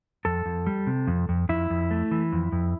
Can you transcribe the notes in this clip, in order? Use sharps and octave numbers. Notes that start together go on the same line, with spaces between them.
F2 A4
F2
G3
C3
F2
F2
F2 E4
F2
A3
E3
F2
F2